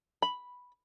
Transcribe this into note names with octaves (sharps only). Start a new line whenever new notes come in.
B5